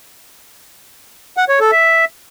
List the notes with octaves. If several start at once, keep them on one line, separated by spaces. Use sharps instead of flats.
F#5
C#5
A4
E5